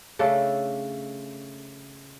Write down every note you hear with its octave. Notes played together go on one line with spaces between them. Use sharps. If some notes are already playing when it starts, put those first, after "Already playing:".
C#3 A3 D4 A4